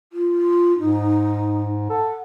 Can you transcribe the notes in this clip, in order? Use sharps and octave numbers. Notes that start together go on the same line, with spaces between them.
F4
G#2 D#4
A4 F#5